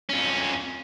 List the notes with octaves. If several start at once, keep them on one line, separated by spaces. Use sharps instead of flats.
F2 C#4